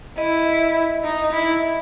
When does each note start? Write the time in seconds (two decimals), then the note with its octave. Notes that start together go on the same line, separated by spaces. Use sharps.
0.18 E4 D#5
1.04 D#4
1.33 E4